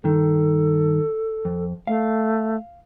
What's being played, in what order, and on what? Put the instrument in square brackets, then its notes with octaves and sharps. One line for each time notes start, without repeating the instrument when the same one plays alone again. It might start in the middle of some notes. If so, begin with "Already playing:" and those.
[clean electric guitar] G2 D#3 [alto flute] A4
[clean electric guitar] F2
[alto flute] A3 [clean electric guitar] F5